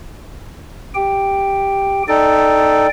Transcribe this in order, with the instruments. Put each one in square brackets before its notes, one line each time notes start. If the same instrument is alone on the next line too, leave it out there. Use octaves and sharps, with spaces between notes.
[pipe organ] G4 G5
[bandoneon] D#4 A4 [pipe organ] D5 G5